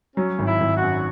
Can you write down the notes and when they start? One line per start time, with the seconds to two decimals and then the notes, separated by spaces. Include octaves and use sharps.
0.16 F#3 C#4
0.39 G#1
0.46 E4
0.61 G#1
0.75 F#4
0.82 F#2